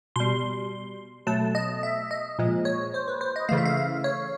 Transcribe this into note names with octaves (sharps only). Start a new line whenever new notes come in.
B2 G3 C6
B2 F#3 A3 A5
D#5
E5
D#5
A#2 F3 G#3
C#5
C5
B4
C5
D#5
C#3 E3 A3 F5
E5
F5
F5
C#5